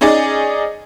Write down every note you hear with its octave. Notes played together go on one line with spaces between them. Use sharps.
C#4 D#4 G#4 D5 D#5